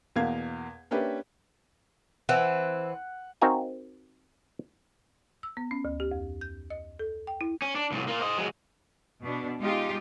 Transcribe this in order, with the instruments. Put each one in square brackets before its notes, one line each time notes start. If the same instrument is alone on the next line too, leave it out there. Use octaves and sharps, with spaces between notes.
[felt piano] E2 B2 A#3 F5 G#6
A#3 C#4 D4 G4 B4 E5
[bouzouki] E3 C4 [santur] F#5
[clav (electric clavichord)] C4 D#4 F#4 A#4 F5 G#5
[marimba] E6
B3
C#4
D2
G4
F2
G6
D#5
A4
G5
E4
[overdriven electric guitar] C#4
D4
C2 A2
A#3 F4
C5 D#5
F#3 G#3
[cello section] B2 D4
G#3 D#4 F4 G4